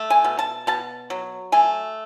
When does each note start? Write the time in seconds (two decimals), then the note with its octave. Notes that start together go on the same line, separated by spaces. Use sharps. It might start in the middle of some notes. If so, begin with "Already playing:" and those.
Already playing: A3
0.10 G#5
0.24 B2
0.39 A5
0.67 B2 A5
1.10 F#3
1.52 A3 G#5